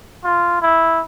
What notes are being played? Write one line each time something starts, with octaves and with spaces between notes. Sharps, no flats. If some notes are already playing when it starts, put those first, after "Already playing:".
F4
E4